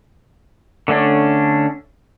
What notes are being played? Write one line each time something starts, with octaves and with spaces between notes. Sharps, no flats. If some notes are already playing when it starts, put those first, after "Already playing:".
D3 A3 C#4 D4